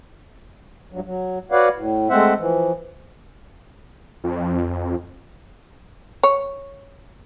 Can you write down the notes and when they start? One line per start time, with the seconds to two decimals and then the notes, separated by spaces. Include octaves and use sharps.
0.92 G2 F#3
1.05 F#3
1.52 F#4 B4 C#5 D5 F5 F#5
1.76 A2
2.10 G#3 A3 C4 C5 E5 F#5
2.38 E3 F3
4.24 F2
6.23 C#5